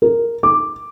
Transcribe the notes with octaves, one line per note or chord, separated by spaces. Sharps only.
A#4
D6